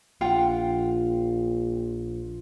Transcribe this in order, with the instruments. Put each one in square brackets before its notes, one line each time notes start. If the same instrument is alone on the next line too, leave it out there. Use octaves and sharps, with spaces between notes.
[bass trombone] A#1 [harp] F4 [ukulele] F#5 G5